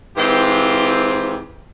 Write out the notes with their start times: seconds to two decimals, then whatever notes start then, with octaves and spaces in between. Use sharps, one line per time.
0.18 G#2 E3 C4 F4 G4